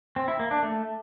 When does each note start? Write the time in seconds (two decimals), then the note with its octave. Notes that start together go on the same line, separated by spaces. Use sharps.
0.16 C4
0.28 E4
0.39 A#3
0.51 D4
0.63 A3